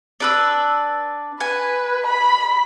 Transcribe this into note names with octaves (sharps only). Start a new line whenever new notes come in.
D4 B4 E6
B4 G#5
B5